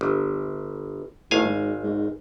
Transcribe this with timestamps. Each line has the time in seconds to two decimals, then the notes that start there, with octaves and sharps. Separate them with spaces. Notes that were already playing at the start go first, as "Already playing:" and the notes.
0.01 G1
1.31 G#1 A2 F5 G#5
1.45 G#2
1.83 G#2